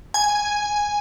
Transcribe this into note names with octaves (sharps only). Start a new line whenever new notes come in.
G#5